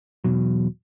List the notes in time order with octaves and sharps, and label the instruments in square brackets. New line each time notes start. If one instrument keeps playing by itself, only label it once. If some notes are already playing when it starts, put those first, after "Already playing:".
[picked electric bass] E1 E2 B2 F#3